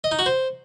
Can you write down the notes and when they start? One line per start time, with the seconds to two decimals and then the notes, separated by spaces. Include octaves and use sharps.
0.04 D#5
0.11 D#4
0.19 F#4
0.26 C5